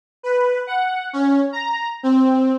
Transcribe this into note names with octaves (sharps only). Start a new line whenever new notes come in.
B4
F#5
C#4
A#5
C4